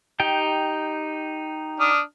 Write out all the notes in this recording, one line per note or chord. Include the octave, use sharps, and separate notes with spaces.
D#4 G4 G5
D4 D#6 F6